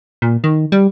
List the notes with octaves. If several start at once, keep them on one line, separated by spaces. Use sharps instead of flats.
A#2
D#3
G3